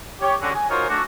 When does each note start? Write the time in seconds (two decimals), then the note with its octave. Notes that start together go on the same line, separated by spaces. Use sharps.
0.22 G4 C#5
0.42 D3 C#4 F#4
0.55 G#5
0.70 D#4 F4 F#4 A#4 C5 C#5
0.89 A3 D4 F#4